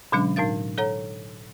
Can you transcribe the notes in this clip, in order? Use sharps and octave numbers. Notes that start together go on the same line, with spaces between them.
B2 D3 F#3 G#3 C#4 D4
A2 D#4 A#4 F5 A6
A4 C#5 F#5 A#5